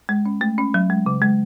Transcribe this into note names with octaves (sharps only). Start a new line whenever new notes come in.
G#3
C#4
A3
C#4
F#3
G#3
C#3
G#3